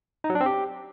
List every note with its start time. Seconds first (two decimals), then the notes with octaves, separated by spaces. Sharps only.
0.24 D#4
0.30 F#3
0.35 D4
0.41 C4
0.46 G4